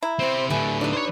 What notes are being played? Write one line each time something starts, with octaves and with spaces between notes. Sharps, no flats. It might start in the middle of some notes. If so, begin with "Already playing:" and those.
E4 A#5
C4 G4 C5
A2 D3 G4 B4 E5 G#5
D4 D#4 B4
C5 C#5